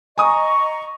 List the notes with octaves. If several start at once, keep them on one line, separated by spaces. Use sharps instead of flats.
D#5 G#5 A#5 C#6 D#6